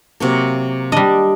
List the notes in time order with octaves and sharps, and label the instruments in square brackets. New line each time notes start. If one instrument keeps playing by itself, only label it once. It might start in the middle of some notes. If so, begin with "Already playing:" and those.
[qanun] C3 F#3 A#3
[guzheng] G3 D#5 [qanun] D4